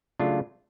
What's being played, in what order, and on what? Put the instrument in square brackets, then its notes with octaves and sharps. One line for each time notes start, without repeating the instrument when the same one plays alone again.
[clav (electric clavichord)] C#3 F#3 A3 D4 F4